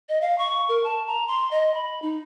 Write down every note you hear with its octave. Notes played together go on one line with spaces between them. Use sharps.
D#5
F5
C#6
A#4
A5
A#5
C6
D#5
B5
D#4